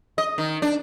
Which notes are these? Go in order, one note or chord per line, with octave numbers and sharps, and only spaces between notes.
D#5
D#3
D4